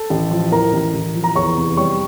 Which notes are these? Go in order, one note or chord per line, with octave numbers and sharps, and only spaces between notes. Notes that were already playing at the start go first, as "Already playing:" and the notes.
Already playing: A4 A5
A1
F3
A2 A#4 A#5
A1
A1
F3
A#5
E2 C#5 C#6
F1
G3 C#5 C#6